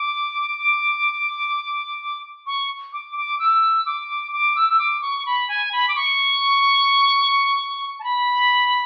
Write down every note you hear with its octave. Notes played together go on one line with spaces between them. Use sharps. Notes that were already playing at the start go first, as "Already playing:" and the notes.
Already playing: D6
C#6
D6
D6
E6
D6
D6
E6
E6
D6
C#6
B5
G#5
B5
D6
C#6
A5
B5